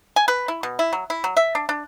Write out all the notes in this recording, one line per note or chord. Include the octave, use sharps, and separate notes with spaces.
G#5
B4
E4
B2
E4
F#3
E4
F#3
E5
D4
D4